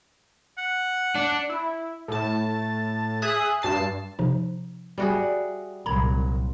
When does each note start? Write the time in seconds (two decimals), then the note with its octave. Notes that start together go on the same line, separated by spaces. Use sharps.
0.58 F#5
1.15 D4
1.49 E4
2.08 A2 A5
3.22 G#4 E5 D#6 F#6
3.62 G2 A5 C7
4.19 C3 F3 D#4
4.98 G3 F#4 G#4 D5 E5
5.86 C2 A#2 F#3 A#4 A#5 B5 G#6